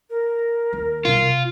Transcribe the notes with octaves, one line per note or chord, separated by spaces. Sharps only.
A#4
D#2
B1 G2 F4
C3